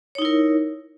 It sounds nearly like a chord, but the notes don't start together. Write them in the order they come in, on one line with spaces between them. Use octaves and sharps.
C#5 D#4 E4 A#4